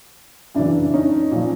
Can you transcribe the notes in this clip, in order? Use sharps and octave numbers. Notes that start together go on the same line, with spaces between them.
F#2 C#3 E3 D4 E4
C#4 D#4
A#2 F3